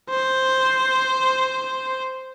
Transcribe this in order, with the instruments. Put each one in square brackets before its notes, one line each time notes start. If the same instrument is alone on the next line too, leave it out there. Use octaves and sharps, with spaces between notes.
[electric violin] C5